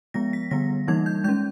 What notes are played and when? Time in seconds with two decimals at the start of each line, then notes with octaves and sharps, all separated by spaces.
0.14 F3 G#3 B3 A#6
0.33 B6
0.51 D3 G3 B3 A#6
0.87 E3 G3 A#3 D#4 G#6
1.06 G6
1.24 G#3 C#4 G6